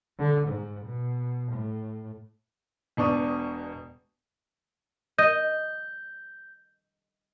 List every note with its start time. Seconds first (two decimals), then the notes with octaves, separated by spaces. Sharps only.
0.19 D3
0.48 G#2
0.86 B2
1.53 A2
2.97 E1 B2 D4 C#6 D#6 D#7
5.18 D#5 G6